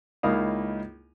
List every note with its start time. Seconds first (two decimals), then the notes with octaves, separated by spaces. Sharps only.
0.23 C#2 A#3 D#4 E4 F5 D#6